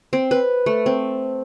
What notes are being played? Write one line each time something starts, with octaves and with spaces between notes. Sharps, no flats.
C4
B4
A3
C4